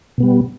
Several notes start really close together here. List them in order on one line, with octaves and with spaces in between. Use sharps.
B2 B3 G3